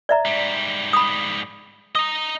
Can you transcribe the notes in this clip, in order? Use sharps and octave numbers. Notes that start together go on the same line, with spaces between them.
D5 E5 A#5
G#2 G3
B5 D#6
D#5 A#5 D#6